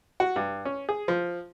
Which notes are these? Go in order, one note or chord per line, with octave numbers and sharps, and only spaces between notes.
F#4
G2
C#4
G#4
F3